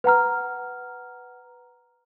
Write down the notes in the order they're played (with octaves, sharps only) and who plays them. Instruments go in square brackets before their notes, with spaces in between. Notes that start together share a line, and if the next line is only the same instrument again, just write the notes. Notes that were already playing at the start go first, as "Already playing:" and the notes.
[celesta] B4 F#5 A#5 F6